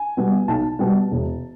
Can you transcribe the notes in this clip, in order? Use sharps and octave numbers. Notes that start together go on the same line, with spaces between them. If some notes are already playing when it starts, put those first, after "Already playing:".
Already playing: G#5
B2 G3 B3
B1 A5
B2 G3 B3
E1